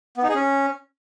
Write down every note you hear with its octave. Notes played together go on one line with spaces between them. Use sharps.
B3
D#4
G#4
C#4